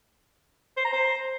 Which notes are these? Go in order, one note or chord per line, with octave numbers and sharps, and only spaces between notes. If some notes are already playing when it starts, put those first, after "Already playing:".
C5
A#5
C5